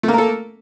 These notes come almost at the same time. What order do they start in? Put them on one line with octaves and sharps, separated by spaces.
A3 A#3 A#4 A4